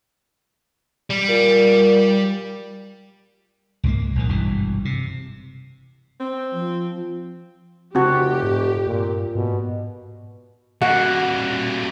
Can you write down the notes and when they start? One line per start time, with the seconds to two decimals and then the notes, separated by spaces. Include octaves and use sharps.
1.10 G3
1.29 A#2
3.84 C#2 G#2 F#3 A#3
4.15 A#1 G2 D#3
4.29 G#1 G2 B2 E3
4.85 C3
6.21 C4
6.54 F3
7.95 F1 C#3 C4 F#4 G4
8.43 G#2
8.87 G2 A#2
9.35 G#2 B2
10.81 G3 A#3 F#4 F#5